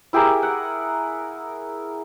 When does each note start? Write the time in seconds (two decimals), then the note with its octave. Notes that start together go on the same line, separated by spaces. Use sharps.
0.13 E4 G4 G#4 A#4
0.43 F#5